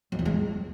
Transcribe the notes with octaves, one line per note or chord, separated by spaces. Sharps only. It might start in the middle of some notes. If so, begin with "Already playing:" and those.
F2
E2
G#3